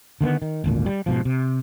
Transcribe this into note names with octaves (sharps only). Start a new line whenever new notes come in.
D3 D#3 A#3 B3
D#3
G#1 D2 A#2
G3
G#2 B2 F3
C3